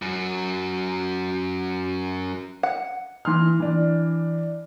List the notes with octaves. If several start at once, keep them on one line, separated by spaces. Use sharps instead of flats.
F#2 F#3
F#5
E3 C6 F6
E3 D4